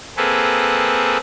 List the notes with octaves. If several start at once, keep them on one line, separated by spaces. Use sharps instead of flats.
A#3 C4 G#4 A4 B4